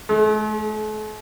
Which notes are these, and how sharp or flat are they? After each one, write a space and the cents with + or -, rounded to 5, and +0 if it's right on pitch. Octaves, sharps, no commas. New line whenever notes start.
A3 -45